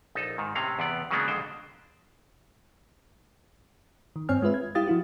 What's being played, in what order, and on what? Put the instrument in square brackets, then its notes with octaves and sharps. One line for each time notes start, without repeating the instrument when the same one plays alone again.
[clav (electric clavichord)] A#1 D#4 A4
G#2 D#3
A2 C3 C4 C#4 F5
E2 C3 B3 D5
C#3 F#3 G#3 A#3 B3 D4
F2 D3 G#3 C5 G5
[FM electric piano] D#3
G2 C4 C#5 G#5 F6
G#3 F4 B4 E5
G#6
G3 E4 G4 F5 D#6 A6
F3 E4 F#4